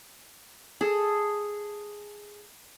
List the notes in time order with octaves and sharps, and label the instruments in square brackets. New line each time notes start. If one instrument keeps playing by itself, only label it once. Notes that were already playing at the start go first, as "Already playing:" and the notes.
[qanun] G#4 A4